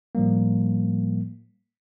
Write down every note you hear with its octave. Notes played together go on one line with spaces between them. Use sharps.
A2 F3 G3 A#3